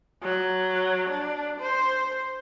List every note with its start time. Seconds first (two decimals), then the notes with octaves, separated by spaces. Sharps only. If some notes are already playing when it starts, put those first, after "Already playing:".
0.22 F#3
1.09 D4
1.60 C5